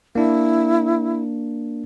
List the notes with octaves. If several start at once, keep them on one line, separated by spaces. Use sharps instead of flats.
A#3 D4 E4